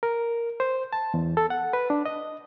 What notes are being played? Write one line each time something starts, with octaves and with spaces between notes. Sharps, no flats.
A#4
C5
A5
E2
A4
F#5
B4
D4
D#5